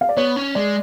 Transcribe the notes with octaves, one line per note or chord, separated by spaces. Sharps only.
F5
D5
B3 C#5
C#4
G#3 D5